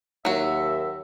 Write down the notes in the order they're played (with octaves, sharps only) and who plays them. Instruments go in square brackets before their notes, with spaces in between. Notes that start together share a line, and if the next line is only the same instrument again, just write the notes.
[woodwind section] D#2 E5 [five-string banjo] F#3 F#4